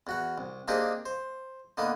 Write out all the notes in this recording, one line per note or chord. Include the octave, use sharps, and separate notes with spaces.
E2 F#4 F#5
C2
A#3 C4 D4 D#4 G4 G#4
C5
D3 A#3 B3 D#4